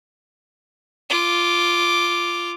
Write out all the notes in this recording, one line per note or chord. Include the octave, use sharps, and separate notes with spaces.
F4 D6